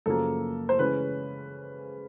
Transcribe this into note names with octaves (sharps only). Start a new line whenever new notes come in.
F#2 C#3 F3 A#3 A4
C5
C#3 E3 G#3 C#4 B4